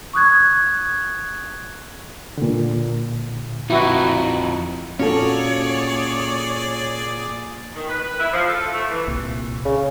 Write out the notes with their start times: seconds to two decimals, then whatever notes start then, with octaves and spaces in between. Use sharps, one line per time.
0.13 C#6 D#6 F#6 G#6
2.38 A#2 D3
3.70 F2 D#4 E4 F#4
5.00 A#2 C#4 F#4 G#4 A4 C#5 D5
7.74 D#3
7.89 B4
8.19 E4
8.32 F3
8.47 A4
8.72 A3
8.89 E3
9.08 C2 A#2
9.65 C#3